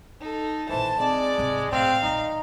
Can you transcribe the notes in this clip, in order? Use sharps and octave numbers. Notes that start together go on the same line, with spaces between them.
D#4 A4
A#1 D#3 E3 C5 A5
G#3 C4 D5
G#1 C3
A2 C4 F5
A#1 D#2 D#4